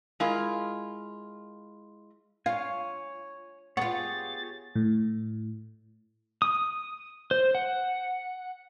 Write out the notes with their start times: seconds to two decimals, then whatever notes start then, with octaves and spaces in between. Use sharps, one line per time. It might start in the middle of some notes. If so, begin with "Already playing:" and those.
0.20 G#3 E4 F4 A#4
2.46 F4 C#5 F5 G#5
3.77 B3 F4 G4 G#4 C#5 F#5 A6
4.76 A2
6.42 D#6
7.31 C5
7.55 F#5